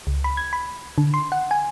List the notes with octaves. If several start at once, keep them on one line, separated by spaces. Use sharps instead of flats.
C#2
B5
G#6
B5
D3
C6
F#5
G#5